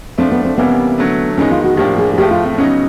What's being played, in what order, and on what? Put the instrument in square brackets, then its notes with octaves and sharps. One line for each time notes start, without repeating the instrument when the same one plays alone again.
[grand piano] F3 A3 D4 [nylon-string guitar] C4
[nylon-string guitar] B3
C4
[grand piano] C3 E3 G3 A#3 C#4 [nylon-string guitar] B3
[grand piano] D3 F#3 A3
[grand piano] D#3 G#3 B3 D#4 [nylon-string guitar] C#4
[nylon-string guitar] F4
F#4
[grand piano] A2 F3 A#3 D4 [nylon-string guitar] G4
[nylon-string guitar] G#4
G#4
[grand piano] A2 F3 A3 [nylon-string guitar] G4
[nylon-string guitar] F4
C4
[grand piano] C#3 F#3 B3 D#4 [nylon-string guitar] C#4